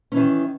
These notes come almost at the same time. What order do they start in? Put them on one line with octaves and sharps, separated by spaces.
C#4 E3 D#3